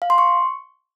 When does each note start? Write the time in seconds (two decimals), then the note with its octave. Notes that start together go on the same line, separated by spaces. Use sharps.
0.02 F5
0.10 C6
0.18 C#6